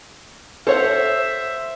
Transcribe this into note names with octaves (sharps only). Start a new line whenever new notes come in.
A4 C5 C#5 E5 F#5